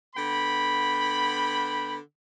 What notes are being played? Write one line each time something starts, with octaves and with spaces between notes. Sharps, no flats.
D3 B3 G5 B5